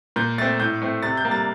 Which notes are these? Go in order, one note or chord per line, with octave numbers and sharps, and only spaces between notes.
A#2 G6
A3 C4 A6
A2 G6
A3 C4
C3 A6
G6
G3 A#3
A6